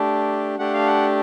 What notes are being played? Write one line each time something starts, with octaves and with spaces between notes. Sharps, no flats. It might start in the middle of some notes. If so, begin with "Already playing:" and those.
Already playing: A3 D4 G4
A3 D4 G4 F#5
F5
F#5